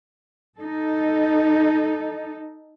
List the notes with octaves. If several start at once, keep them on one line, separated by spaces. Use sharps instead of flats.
D#4 A4